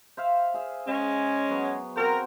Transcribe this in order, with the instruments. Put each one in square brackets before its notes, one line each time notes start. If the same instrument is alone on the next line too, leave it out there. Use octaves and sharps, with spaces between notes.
[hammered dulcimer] C5 E5 F5
G#4 E5
[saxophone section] G#3 C#4
[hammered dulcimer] F#3 B3
[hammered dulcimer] C4 F#4 C5 [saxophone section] A#4